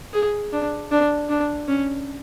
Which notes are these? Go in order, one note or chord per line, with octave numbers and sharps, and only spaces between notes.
G#4
D4
D4
D4
C#4